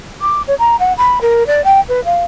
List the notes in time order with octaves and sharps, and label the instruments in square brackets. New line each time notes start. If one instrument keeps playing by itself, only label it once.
[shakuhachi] D6
C#5
A#5
F#5
B5
A#4
D5
G5
B4
F5